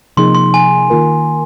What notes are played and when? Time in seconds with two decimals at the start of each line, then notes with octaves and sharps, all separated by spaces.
0.17 C3 F3 A#3 D#4 G#4 C6
0.35 C6
0.54 G#5
0.90 D#3 A#3 F4 A#4